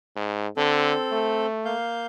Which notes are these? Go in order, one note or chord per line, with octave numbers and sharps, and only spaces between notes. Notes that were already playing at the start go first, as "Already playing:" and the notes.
G#2
D3 C4 A4
A3
A#3 F5 G6